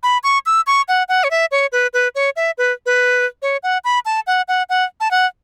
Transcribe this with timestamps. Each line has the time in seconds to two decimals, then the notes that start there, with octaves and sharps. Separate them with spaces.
0.03 B5
0.24 C#6
0.46 E6
0.67 C#6
0.88 F#5
1.09 F#5
1.24 C#5
1.31 E5
1.52 C#5
1.72 B4
1.94 B4
2.15 C#5
2.36 E5
2.58 B4
2.86 B4
3.42 C#5
3.63 F#5
3.84 B5
4.05 A5
4.27 F#5
4.48 F#5
4.69 F#5
5.00 A5
5.11 F#5